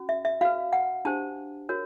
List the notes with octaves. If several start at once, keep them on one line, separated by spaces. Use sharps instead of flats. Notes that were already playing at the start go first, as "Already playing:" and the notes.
Already playing: C#4 F#4
E5
E5
F#4 B4 F5
F#5
D4 G4 C5 A5
F#4 A#4 C#5